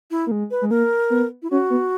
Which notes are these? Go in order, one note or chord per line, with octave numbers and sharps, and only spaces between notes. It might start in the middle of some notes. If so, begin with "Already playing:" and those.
E4
A#3
G#3
B4
G#3
A#3 A#4
B3
E4
C#4 F#4
B3